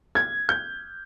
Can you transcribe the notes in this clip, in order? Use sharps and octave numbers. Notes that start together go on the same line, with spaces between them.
G#6
G6